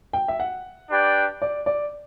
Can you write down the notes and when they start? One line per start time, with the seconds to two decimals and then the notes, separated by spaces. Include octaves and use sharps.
0.13 G5
0.28 E5
0.40 F#5
0.90 D4 G4 B4 D5 G5
1.42 D5
1.66 D5